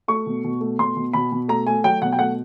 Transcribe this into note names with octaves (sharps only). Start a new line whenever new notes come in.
A3 C#6
B2
B2
A3
B2 C6
B2
B2 B5
B2
A3 A#5
A3 G#5
F#3 G5
B2 F#5
G5
A3 F#5